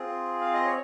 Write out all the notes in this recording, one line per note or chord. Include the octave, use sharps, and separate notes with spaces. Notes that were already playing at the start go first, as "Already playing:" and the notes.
Already playing: C4 F4 G#4
F5
D#5
C#5